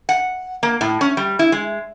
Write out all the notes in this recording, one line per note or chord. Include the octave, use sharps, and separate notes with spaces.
F#5
A#3
A2
C#4
G3
E4
G#3